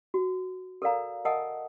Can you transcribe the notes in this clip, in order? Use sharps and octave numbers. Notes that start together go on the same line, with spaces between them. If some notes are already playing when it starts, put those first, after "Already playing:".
F#4
A4 A#4 D5 F5 A#5
A#4 D#5 F#5 G#5 A5 D#6